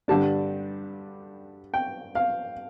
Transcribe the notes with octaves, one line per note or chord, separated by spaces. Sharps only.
G2 D3 G3 D4 A5
G5
F5